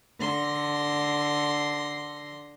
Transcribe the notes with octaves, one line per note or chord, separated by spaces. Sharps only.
D3 C6 A#6